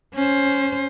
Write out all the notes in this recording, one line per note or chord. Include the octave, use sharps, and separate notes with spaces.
C#4 C5